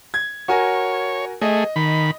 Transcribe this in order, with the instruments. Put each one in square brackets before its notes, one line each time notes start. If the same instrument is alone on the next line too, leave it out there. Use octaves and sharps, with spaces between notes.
[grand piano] G#6
[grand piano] F#4 A#4 G#5 [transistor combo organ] C#5
[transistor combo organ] A3 G#4 [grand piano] D#5
[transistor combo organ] D#3 B5